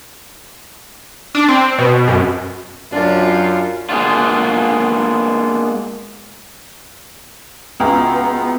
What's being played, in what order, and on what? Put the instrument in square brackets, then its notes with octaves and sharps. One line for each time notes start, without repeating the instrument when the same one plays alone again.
[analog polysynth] D4
C4
B2
F#2
[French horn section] F#2 [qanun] D4 D5 [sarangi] F4
[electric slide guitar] G#3 A#3 B3 D4 F4
[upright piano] C#2 [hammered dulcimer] E3 F4 F#4 [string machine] B3 [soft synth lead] A#5